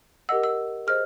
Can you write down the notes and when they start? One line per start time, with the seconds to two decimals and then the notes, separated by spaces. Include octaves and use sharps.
0.29 G4 A#4 D#5 F#5 E6
0.44 E6
0.87 G#4 C5 D#5 F6